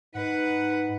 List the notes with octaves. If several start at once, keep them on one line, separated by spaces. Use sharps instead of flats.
G#2 D#4 B4 F#5